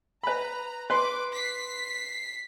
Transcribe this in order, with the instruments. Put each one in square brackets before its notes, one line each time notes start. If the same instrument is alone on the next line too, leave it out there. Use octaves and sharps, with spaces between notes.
[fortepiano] B4 B5 [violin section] A#5
[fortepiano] B4 C6 [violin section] D6
[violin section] B6 C7